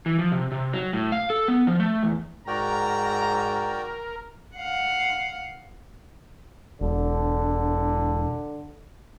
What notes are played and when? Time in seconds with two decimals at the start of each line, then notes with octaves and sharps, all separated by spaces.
0.06 E3
0.19 F3
0.32 C3
0.52 C3
0.73 F#3
0.93 A2
1.12 F5
1.30 A4
1.48 B3
1.67 F3
1.80 A3
2.03 E2
2.47 G#2 F#4 A#4 D5 G5 A#5
4.55 F5 F#5
6.81 E1 D3